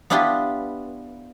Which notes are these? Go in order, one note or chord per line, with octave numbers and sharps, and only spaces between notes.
B3 D4 E4 F4 G4 B4